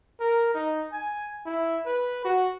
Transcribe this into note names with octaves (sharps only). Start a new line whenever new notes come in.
A#4
D#4
G#5
E4
B4
F#4